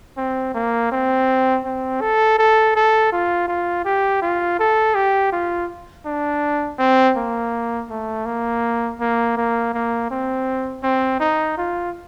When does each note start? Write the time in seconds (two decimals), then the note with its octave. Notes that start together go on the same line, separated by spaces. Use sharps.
0.17 C4
0.55 A#3
0.92 C4
1.65 C4
2.01 A4
2.39 A4
2.76 A4
3.12 F4
3.48 F4
3.85 G4
4.22 F4
4.60 A4
4.95 G4
5.32 F4
6.06 D4
6.79 C4
7.17 A#3
7.90 A3
8.26 A#3
9.01 A#3
9.37 A#3
9.74 A#3
10.11 C4
10.83 C4
11.20 D#4
11.58 F4